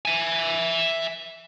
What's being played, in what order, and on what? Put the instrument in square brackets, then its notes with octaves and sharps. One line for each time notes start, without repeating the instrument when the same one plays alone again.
[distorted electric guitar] E5 G#5